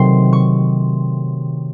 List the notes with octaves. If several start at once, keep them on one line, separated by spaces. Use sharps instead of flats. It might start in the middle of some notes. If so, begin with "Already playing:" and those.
Already playing: C3 D#3 F#3 A3 C4 C6
C#6